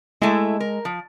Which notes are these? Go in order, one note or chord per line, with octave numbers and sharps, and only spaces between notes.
G#3 A3 E4
A#4
F3